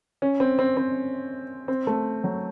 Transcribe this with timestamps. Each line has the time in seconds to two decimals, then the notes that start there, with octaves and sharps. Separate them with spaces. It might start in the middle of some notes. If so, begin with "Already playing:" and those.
0.22 C#4
0.40 C4
0.59 C4
0.77 C4
1.68 C4
1.87 A3
2.24 F#3